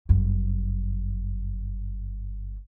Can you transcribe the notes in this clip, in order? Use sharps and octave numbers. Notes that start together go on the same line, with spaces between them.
G1 F#2